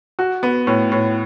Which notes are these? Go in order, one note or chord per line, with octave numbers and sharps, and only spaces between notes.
F#4
B3
A2
A2